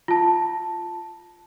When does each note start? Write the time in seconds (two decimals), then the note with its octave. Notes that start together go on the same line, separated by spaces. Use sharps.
0.08 F4 A5